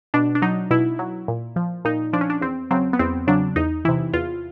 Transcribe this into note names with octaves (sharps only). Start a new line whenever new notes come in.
B2 D4
D4
F#3 D#4
B2 E4
F#3
A#2
F3
A#2 D#4
F3 D4
C#4
D4
E2 C4
C#3 F#3 C4
B3
E2 C4
C#3 F#3 D4
E2 D#4
C3 E3 E4
E2 F4